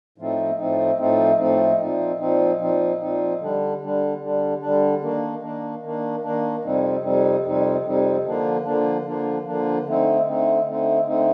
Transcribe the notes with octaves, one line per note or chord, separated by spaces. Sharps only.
A2 F3 A3 C4 D#4
A2 F3 A3 C4 D#4
A2 F3 A3 C4 D#4
A2 F3 A3 C4 D#4
A#2 F3 C4 D#4
A#2 F3 C4 D#4
A#2 F3 C4 D#4
A#2 F3 C4 D#4
D3 G3 D4
D3 G3 D4
D3 G3 D4
D3 G3 D4
D#3 A#3 D4
D#3 A#3 D4
D#3 A#3 D4
D#3 A#3 D4
F2 C3 G3 C4 D#4
F2 C3 G3 C4 D#4
F2 C3 G3 C4 D#4
F2 C3 G3 C4 D#4
D3 F3 A#3 D4
D3 F3 A#3 D4
D3 F3 A#3 D4
D3 F3 A#3 D4
D3 A3 C4 D#4
D3 A3 C4 D#4
D3 A3 C4 D#4
D3 A3 C4 D#4